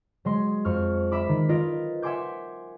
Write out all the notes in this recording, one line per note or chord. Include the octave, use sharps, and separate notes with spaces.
F#3 G#3 C6
F2 C#6 F6
E5 B5 D6
D#3
F4 A#4 B4 D#5 D7
E5 F#5 G#5 C6 D6 G6